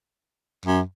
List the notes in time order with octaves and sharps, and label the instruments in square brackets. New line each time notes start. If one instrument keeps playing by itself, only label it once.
[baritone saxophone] F#2